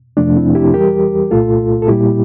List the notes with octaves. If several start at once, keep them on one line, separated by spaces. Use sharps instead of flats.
F2 C3 F3 A3 D4
C4 E4
E4 G4
E2 E3 G3 G4 A#4
C2 A#2 A3 F4 A4
A4
A#2 G3 A#3 E4 G4